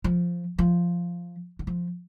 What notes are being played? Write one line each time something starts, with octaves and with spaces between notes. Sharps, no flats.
F3
F3
D#3
F3